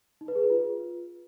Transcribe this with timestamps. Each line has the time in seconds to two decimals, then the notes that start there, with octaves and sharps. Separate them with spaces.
0.21 D#4
0.28 B4
0.35 G#4
0.43 B4
0.50 F4